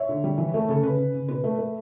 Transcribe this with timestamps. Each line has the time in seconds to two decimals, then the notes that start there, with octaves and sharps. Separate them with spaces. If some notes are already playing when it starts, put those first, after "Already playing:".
Already playing: C#5 E5
0.09 D3
0.24 G3
0.38 E3
0.54 A3
0.69 C#3 A4
0.83 C#3 B4
0.98 C#3
1.14 C#3
1.28 B2 B4
1.44 A3
1.59 A3